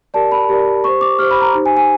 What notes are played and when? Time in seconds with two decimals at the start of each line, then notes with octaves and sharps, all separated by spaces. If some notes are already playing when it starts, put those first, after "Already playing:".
0.14 G4 A#4 D5 A5
0.32 B5
0.49 G4 A#4 D5
0.83 G4 C5 C#6
1.01 D6
1.18 G4 C5 F6
1.31 B5
1.42 A#5
1.53 D#4 G4 C5
1.66 G#5
1.77 G#5